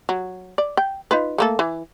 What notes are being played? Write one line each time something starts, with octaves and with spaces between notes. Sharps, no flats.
F#3
D5
G5
D#4 F4 B4
A3 A#3 A4
E3